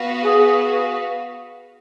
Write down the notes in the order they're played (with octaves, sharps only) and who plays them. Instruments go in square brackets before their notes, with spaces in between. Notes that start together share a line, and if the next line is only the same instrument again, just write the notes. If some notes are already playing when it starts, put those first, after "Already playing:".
Already playing: [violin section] B3 F#4 B4 F5
[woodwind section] G#4